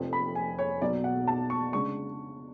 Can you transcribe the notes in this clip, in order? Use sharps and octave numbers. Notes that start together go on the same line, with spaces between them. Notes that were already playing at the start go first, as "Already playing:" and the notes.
Already playing: F1 F2 F3
B5
G#5
C#5
B1 B2 F#3 D5
F#5
A5
C#6
C#3 G#3 D4 C#6